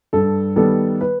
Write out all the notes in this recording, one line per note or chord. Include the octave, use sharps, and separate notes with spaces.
G2 A4
D#3 G3 B3 A4
B4